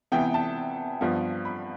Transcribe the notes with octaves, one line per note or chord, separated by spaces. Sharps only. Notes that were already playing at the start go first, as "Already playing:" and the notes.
C3 E3 B3 G5
A5
G2 F3 B3
B5